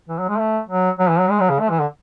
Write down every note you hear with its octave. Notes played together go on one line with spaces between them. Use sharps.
E3
F#3
G#3
A3
F#3
F#3
E3
F#3
G#3
F#3
C#3
A3
E3
D3